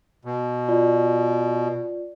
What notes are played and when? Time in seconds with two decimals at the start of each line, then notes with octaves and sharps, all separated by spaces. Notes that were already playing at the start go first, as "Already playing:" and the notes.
0.25 B2
0.68 F4 D5